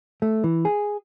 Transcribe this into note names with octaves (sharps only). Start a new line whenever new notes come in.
A3
E3
G#4